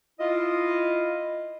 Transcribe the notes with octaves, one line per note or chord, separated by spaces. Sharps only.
E4 F4 D#5